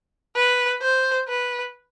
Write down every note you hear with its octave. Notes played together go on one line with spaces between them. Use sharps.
B4
C5
B4